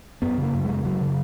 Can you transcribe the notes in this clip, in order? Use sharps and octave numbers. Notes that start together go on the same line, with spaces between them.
F#2 B3
C#3
A#3
F#2
G#3
C#3
F#2 F#3
C#3